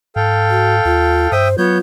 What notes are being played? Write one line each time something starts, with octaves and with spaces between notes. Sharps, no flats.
G#2 A4 F5 G5
F#4
D#2 F4
G2 C5 E5 G5 D#6
F#3 B3 F4 C#5 G6